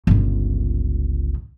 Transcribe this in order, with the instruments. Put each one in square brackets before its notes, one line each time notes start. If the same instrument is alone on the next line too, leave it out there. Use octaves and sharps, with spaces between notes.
[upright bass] G1 C#2